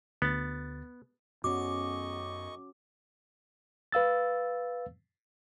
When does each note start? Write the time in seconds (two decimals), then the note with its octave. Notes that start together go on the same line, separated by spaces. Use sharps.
0.22 D2 B3 A6
1.44 F#2 B3 C#4 F#4 D#5 C#6 D6
3.92 B4 F5 E6 A6